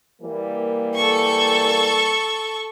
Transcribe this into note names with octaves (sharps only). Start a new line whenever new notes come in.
E3 G3 A#3
A4 C#6